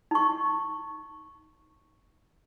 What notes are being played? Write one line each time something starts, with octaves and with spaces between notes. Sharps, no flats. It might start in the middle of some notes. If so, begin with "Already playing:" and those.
D#4 C#6